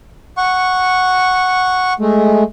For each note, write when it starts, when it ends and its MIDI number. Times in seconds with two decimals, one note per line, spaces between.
0.37 1.93 78
0.37 1.93 85
1.99 2.43 56
1.99 2.43 57